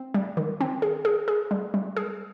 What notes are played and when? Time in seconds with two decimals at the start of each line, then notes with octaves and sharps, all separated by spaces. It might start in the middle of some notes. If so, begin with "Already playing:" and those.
Already playing: C4
0.14 G3
0.37 D#3
0.61 C4
0.82 G#4
1.05 G#4
1.28 G#4
1.51 G3
1.74 G3
1.97 G#4